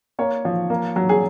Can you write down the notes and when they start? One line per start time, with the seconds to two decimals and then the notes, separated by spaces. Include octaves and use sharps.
0.19 A#3 C#5
0.45 F3
0.70 A#3
0.96 F#3
1.09 G#4